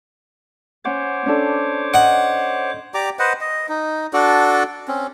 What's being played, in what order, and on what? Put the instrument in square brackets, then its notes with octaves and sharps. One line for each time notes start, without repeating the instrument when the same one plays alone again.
[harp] C#4 F#5 [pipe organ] C5 C#5 D6
[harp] C#4 D4 A4
[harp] D#5 [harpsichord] F#5
[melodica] G4 D5 A#5 D6
B4 C5 D#5 F#5
D#5
D#4
D4 F#4 A4 D5
C4 C#4